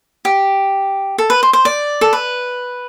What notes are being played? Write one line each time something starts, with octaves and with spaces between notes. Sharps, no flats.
G4
A4
B4
C5
C5
D5
A4
B4